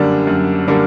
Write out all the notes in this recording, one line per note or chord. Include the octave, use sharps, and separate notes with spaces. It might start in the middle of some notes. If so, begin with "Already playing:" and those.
Already playing: F#2 D3 G3 A#3 D4
F#2
D3 G3 A#3 D4